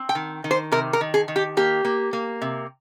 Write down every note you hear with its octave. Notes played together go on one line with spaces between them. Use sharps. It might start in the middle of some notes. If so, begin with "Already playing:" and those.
Already playing: C4
G5
D#3
D#3
C5
C3 A#4
A#4
D#3
G#4
D#3
G4
A#3 G4
A#3
A#3
C3